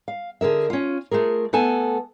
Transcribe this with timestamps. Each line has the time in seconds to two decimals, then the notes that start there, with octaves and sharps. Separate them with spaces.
0.08 F5
0.41 D3 G#4 A#4 E5
0.70 C#4 F4
1.11 A3 F4 G#4 A#4
1.53 A3 B3 A4 G#5 A5